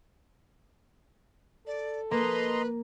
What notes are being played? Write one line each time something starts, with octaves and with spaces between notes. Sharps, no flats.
A4 D5
A#3 B4 D#5 A#5 C6